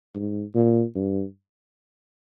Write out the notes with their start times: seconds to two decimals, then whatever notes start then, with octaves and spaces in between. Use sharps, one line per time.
0.15 G#2
0.55 A#2
0.95 G2